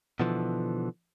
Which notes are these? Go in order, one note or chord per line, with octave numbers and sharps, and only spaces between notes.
B2 D3 E3 F3